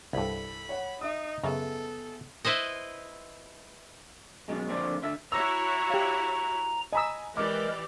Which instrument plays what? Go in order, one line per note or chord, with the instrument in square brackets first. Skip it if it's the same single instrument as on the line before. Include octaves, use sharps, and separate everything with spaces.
[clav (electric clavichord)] C2 G2 [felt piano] E4 A4 [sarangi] B5
[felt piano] C#5 F#5
[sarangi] D#4 [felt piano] E5 D#6
[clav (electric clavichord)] F#2 C#3 A#5 [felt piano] B3 G#4 E5 [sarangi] A4
[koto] E4 B4 C5 D#5
[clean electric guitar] F#2 B2 G#3
F2 D3 A#3 C5 D5
D3 E5
[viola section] E4 F#4 C#5 [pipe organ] A#5 [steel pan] D6 [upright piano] E6 A#6
[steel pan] G4 F5
[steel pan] D#5 B5 E6 [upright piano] G#5 A#5 D#6
[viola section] E3 G4 D5 [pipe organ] G#3 A#4 [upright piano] D6